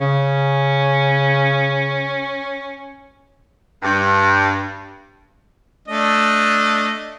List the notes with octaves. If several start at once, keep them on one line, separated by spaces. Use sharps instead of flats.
C#3 C#4
G2
A3 D4 D#5